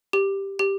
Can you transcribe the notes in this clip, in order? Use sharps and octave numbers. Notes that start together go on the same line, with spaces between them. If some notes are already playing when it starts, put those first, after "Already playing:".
G4
G4